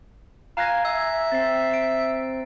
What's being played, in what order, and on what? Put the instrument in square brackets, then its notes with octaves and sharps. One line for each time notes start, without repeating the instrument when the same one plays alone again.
[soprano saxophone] F5 [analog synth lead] G#5 [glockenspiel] A#5 F#6 A#6
[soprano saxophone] E5 [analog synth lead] G#5 [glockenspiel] E6
[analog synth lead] C4 [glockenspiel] A6 C7
[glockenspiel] D7